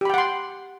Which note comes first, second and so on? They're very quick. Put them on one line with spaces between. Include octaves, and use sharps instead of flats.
G4 B5 G5 F#5 C6